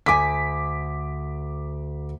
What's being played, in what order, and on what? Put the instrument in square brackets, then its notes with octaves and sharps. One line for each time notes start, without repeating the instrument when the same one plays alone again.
[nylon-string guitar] D2 G#5 [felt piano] D6 B6